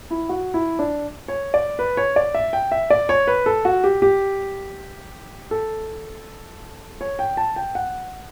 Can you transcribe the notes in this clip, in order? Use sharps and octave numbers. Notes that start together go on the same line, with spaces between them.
E4
F#4
E4
D4
C#5
D5
B4
C#5
D5
E5
G5
E5
D5
C#5
B4
A4
F#4
G4
G4
A4
C#5
G5
A5
G5
F#5